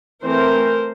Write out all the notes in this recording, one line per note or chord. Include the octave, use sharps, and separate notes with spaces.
E3 A3 C4 A#4 C5